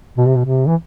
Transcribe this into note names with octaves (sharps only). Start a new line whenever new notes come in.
B2
C3
B2
C3
E3